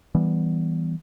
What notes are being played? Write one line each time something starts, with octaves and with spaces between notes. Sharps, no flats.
E3 G3 B3